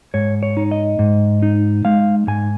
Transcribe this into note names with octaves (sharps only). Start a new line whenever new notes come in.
G#2 C#5
C#5
D#4
D#5
G#2
D#4
G#3 F5
G#2 G#5